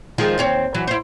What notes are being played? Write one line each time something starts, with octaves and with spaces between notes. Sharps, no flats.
D#3 F3 G#3
D#2 C4 C#5
E3 F#3
E4 C5